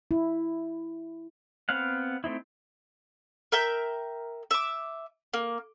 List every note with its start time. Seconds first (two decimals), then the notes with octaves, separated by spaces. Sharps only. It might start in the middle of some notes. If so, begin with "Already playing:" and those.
0.11 E4
1.69 B3 C4 F5 F#5
2.24 A3 C4 D#4 E4
3.52 A#4 E5 G5 G6
4.51 E5 D6
5.34 A#3